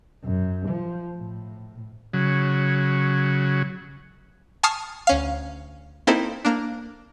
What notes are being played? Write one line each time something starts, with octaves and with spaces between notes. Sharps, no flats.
F#2
F3
A2
C#3 F#3
G#5 A5 C#6 D#6 F6 C7
D2 C#4 F5
A#3 C4 D#4 E4 A4
A#3 D4